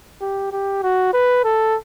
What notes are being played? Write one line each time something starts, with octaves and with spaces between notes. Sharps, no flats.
G4
G4
F#4
B4
A4